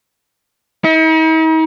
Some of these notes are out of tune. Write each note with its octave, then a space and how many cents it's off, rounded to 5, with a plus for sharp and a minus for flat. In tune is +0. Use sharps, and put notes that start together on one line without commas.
D#4 +45